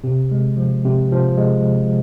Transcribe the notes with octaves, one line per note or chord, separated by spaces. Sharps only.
C3
G#3
F3
C3
F3
G#3